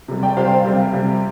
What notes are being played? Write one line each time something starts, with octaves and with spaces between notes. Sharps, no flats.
C3 G3
D5 G5
C3 G3 C5 F5
C3 G3
C3 G3